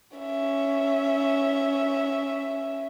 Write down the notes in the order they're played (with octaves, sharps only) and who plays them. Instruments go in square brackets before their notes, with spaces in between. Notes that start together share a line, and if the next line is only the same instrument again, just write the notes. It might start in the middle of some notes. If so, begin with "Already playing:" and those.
[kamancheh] C#4 E5